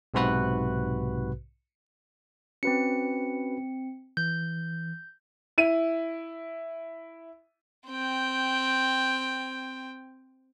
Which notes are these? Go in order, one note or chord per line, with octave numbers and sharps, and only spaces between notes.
B1 G#2 C3 F#4 B4 F#6
C4 C#4 F#4 B4 C#7
E3 G6
E4 D#7
C4 G5